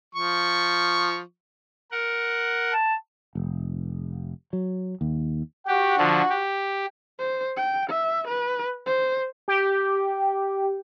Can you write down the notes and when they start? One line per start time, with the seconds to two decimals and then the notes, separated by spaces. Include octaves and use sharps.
0.15 F3 C#6
1.91 A#4 F#5
2.73 A5
3.35 F1
4.53 F#3
5.01 D#2
5.68 F#4 G4 F#5
5.98 D3 F3
6.30 G4
7.19 C5
7.57 G5
7.89 E5
8.27 B4
8.86 C5
9.48 G4